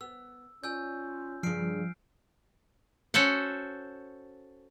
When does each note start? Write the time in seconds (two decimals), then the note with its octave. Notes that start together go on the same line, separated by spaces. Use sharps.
0.01 B3 E6
0.64 C#4 F4 D5 G#5 E6 G6
1.43 G2 C#3 F3 F6 C7 D7
3.14 C#4 F#4 A4 C5 F#5